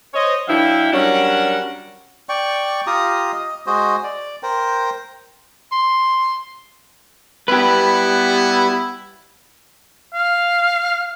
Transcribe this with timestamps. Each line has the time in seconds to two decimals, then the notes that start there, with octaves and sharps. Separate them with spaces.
0.14 C5 C#5 D#5
0.48 F#3 D4 E4 E5 F5 G5
0.93 F#3 G3 C#4 D4 A#4 F#5
2.29 D5 G5 C#6
2.87 F4 G4 A#5 D#6
3.32 D#5
3.66 G#3 F#4 C5 D#5
4.04 D5
4.43 A#4 C5 G5
5.72 C6
7.48 G3 B3 E4 G4 B4
10.14 F5